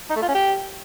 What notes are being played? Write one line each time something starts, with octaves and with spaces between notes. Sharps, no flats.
D#4
A3
F4
C#4
G4